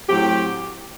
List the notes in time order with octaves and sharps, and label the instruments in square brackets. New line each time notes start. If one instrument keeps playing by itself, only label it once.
[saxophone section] A2 F#3 C4 G4